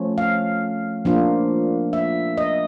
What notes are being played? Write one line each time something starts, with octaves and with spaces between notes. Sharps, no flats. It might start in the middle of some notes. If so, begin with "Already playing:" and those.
Already playing: F3 A3 C#4
F5
F3 A#3 D4 F4
E5
D#5